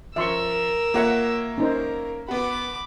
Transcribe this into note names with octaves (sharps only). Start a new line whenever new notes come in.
F3 C#4 A#4 E5 C6 C#6 E6
A#3 F4 C#5 E5 F#5
C#4 D#4 A#4 C5
B3 F#4 B5 D6